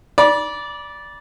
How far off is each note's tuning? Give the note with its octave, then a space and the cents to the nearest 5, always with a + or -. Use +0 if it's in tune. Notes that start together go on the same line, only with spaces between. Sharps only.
D5 -10 B5 -40 D6 +15